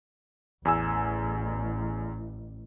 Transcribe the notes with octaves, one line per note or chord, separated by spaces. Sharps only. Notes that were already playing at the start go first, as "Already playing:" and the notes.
A1 E2 G#5 E6